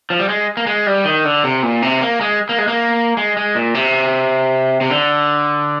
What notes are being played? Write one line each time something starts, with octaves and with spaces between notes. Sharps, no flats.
F3
G3
G#3
A#3
G#3
G3
D#3
D3
C3
A#2
C3
A#3
G#3
A#3
G#3
A#3
G#3
G#3
A#2
C3
C3
D3